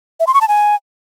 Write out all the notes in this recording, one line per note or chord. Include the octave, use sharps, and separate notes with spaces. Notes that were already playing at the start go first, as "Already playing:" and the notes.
E5
C6
C#6
A5
G#5